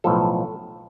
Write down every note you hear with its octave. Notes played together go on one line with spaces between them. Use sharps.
B1 A2 F3 A4